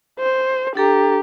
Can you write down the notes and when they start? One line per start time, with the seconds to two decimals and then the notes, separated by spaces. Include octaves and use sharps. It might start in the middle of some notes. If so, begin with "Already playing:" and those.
0.19 C5
0.75 D4 G4 A4 A#5